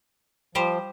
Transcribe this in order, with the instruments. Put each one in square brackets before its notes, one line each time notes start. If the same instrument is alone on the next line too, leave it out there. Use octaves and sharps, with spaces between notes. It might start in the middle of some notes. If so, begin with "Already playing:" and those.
[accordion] F3 [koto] G3 G4 C5